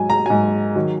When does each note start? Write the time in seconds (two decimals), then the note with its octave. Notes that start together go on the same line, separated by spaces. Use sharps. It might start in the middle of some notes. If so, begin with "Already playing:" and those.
Already playing: G#2 F#3 G#5
0.10 A#5
0.26 G#2 F#3 G#5
0.76 D#3 F#3